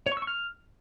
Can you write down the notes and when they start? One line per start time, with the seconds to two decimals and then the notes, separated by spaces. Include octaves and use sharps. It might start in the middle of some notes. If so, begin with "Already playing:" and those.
0.06 C#5
0.12 C#6
0.17 E6
0.22 C#6
0.27 F6